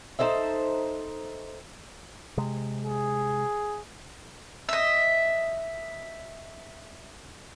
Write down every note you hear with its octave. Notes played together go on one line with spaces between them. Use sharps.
D#4 A4 C5 E5
C3 G#3
G#4
D#5 E5